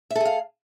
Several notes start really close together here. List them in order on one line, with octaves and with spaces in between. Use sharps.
E5 A4 G#4 F5